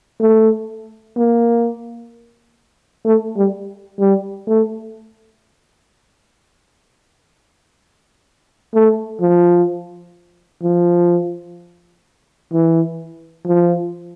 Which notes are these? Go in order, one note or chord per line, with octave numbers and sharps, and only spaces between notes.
A3
A#3
A3
G3
G3
A3
A3
F3
F3
E3
F3